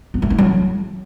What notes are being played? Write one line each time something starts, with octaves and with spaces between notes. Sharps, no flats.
B3
A3
D#4
F#3